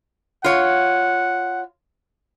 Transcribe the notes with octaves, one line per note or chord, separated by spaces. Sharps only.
F4 C#5 F#5